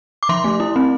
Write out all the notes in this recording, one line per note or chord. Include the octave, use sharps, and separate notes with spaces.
D6
F3 C6
A3
E4
C4